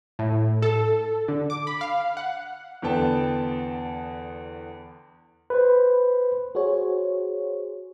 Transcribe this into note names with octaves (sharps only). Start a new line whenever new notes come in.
A2
A4
D3
D6
B5
F5
F#5
E2 D3 B3 G5 A5
B4 C5
F#4 G#4 C5 C#5